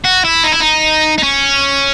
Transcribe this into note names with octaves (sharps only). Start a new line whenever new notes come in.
F#4
E4
D#4
E4
D#4
D#4
C#4